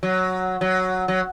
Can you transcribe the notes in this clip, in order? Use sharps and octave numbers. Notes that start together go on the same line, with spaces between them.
F#3
F#3
F#3